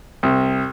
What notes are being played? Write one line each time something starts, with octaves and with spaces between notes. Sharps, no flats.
C2